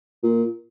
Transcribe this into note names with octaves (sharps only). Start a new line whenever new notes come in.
A#2